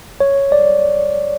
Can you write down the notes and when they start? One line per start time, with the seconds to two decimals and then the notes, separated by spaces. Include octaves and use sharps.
0.20 C#5
0.52 D5